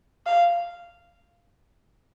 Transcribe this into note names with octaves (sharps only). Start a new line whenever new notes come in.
F5